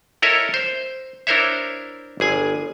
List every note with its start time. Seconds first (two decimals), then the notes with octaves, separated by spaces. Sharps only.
0.22 E4 A4 A#4 C#5 D#5 E5
0.54 C5
1.27 D4 E4 A#4 C5 C#5 E5
2.20 G1 G#4 G#5